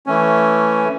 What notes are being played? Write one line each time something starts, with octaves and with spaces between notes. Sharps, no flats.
E3 A3 C#4